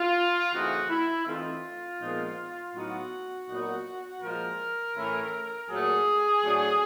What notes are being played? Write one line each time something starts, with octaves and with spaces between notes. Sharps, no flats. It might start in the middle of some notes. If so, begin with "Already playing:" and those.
Already playing: F4
C#3 E3 A3 C4 D#4 F#4
E4
E3 A3 C4 D#4 F4
A#2 F3 G#3 B3 D#4
A2 F#3 B3 D#4 F#4
A#2 F#3 B3 D#4
A#2 F3 G#3 A#4
A2 E3 A3 C#4 E4
A#2 F#3 A3 G#4
A2 F#3 A3 D4